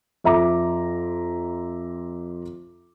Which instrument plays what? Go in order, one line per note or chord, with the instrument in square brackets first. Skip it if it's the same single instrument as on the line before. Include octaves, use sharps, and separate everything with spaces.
[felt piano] F2 E5 A#5 D6